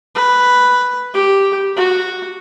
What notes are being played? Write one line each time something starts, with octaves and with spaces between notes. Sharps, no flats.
B4
G4
F#4